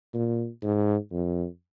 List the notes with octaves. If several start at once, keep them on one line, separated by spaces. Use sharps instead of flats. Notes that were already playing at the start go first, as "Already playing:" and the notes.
A#2
G#2
F2